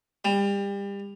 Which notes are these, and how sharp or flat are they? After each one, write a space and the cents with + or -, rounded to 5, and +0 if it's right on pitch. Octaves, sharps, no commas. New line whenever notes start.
G3 +30